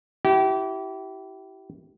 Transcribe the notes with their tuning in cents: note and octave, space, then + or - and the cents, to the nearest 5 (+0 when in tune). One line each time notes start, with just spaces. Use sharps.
E4 +0 G4 -35